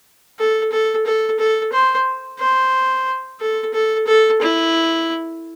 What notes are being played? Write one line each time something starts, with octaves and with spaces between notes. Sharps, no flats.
A4
A4
A4
A4
C5
C5
A4
A4
A4
E4